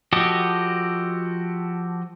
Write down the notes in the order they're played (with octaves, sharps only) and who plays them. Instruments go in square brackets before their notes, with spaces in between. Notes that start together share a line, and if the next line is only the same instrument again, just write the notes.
[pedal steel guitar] F3 F#4 G4 A4 D#5